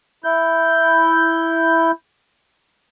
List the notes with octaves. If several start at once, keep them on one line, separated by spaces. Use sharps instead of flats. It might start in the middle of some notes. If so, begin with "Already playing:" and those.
E4 G6